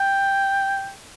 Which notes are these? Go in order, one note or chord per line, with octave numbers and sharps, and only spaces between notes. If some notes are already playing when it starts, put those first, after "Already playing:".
Already playing: G5